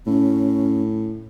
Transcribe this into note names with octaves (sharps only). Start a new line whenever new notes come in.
A2 C#4